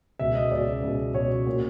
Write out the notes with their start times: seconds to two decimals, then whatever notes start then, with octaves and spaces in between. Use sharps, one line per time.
0.19 C#2 B2 E5
0.35 D#5
0.51 C#2 B2 D5
0.83 C#2 B2
1.14 C#2 B2 C#5
1.47 A#2